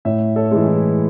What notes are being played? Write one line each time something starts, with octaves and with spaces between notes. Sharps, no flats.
A2 C#5 E5
A4 C#5
E3 G#3
E4